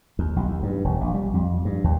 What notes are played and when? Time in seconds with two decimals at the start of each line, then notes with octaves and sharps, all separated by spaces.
0.19 D#2
0.36 B1
0.48 D#2
0.63 G2
0.84 E1
1.01 A#1
1.14 G3
1.34 F2
1.65 G2
1.84 D#2